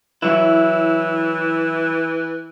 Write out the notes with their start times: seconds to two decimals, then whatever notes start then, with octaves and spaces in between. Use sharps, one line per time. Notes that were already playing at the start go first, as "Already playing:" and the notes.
0.22 E3 F#3 E4